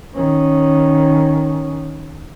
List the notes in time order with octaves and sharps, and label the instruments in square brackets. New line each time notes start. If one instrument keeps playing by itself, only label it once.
[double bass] D#3 C#4